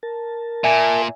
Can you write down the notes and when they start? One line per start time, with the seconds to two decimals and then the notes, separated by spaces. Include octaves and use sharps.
0.03 A#4 A5
0.64 A#2 E5 G#5